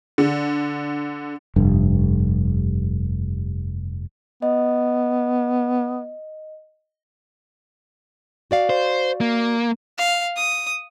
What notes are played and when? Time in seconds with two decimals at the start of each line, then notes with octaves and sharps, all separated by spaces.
0.18 D3
1.56 F1 G2
4.42 B3 D#5
8.51 F#4 D5 F5
8.70 C5
9.21 A#3
9.98 F5
10.36 D#6